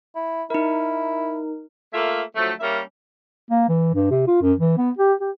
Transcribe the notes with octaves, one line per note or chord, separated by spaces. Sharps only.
E4
D#4 E4 A#4
A3 A#3 F4 E5
D3 F3 F#3 A3
G3 A#3 C#4 A#4 E5
A#3
E3
G2
C3
F4
F#2
E3
B3
G4
G4